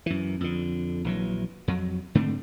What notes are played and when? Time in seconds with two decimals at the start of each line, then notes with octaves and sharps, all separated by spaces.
0.06 F#2 E3
0.41 F2 D3
1.05 A#1 E3 F#3
1.68 F2 F#3
2.15 G#2 D3 A3 C4